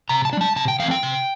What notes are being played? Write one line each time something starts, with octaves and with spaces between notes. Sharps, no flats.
C3 A#5
A5
D4
G3 A5
C3 A5
G5
E3 A3 C4 F5
G5
C3